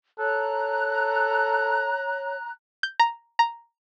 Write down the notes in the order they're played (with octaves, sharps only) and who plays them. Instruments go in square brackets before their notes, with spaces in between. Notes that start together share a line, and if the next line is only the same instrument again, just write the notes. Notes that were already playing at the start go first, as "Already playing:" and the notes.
[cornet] A4 [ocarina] C#5 [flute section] A#5 F#6
[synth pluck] G6
A#5
A#5